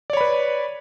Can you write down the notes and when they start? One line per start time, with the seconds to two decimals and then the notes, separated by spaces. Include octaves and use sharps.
0.10 D5
0.13 C#5
0.17 B5
0.21 B4